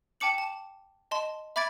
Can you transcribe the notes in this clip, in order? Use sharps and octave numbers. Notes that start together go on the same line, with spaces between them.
G5 A5 D6 C#7 F#7
A5
D#5 A5 C6
E5 B5 D6 G#6 A6 D7